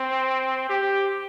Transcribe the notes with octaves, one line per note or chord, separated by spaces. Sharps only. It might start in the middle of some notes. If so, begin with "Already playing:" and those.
Already playing: C4
G4